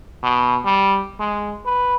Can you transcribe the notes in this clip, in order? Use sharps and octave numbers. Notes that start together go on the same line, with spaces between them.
B2
G3
G#3
B4